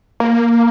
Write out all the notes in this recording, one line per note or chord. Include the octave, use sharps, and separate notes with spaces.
A#3